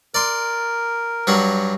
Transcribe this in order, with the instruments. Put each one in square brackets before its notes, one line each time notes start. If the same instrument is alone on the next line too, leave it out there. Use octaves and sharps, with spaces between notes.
[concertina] A#4 [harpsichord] D5 C6
[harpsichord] G2 F#3 F#5